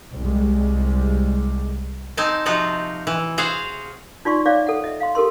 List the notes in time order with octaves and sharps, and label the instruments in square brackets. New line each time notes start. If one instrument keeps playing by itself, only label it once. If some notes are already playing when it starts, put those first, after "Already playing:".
[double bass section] C2 G3 G#3
[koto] C4 D#4 G#5 A5
C3 F3 D#4 F4 F#4
E3
F#4 G#4 C5 F5
[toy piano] D#4 F4 D5 C6 C#6
C#5 D5 E5 F5 D6
A4 F#5
D#5 E5
F5 C6
G4 A4 A#4 C6